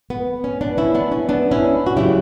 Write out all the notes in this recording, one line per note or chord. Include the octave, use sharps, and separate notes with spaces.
B3
C#4
B3 D4
C#4 E4
B3 D4
C#4
B3 D4
C#4 E4
F#4
E2 C#3 F#3 E4 G4